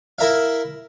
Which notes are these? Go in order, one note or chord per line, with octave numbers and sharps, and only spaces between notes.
E4 A#4 E5 F5